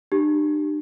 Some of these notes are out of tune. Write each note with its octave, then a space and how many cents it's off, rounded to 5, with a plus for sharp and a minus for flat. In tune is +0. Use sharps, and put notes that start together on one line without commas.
D4 +45 G4 +0